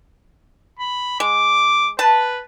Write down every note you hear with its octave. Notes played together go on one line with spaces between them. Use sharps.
B5
G#3 D6
B4 A5